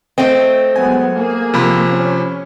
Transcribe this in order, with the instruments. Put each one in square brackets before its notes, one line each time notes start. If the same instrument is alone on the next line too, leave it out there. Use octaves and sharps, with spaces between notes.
[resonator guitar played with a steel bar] A3 C4 [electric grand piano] D#5 G5
[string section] F#3 G#3 B3 [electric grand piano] G#5
[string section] A#3 G#4
[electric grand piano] C3 F3 B5
[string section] C#4